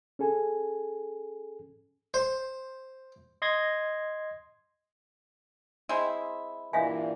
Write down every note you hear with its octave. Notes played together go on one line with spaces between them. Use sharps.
C#4 G#4 A4 G#5
C5
D#5 C6 G#6 A#6
G#3 C4 E4
G2 A#2 E3 E5 F5 G#5